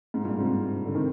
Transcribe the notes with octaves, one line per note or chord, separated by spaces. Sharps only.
G#2
G2 A#2
G#2 C3
D3
C3 D#3